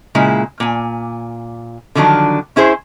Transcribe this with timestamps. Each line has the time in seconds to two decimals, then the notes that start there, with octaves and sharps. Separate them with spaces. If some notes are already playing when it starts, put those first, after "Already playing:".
0.15 A#2 C#3 G#3 E4
0.60 A#2 G#5
1.95 D3 D#3 F3 F#3 D4
2.56 C#4 E4 G#4 C5